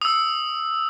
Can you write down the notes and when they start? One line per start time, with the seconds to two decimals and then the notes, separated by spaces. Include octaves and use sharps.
0.02 D#6 E6